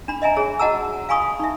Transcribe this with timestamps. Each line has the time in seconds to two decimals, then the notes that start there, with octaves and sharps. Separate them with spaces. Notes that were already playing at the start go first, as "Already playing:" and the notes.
0.08 D4 B5
0.22 D#5 E5 G#5 A#5
0.36 G#4 C#5
0.59 F#4 D#5 F#5 A5 A#5 E6
1.09 F5 G#5 B5 C#6 D#6
1.40 D#4 E5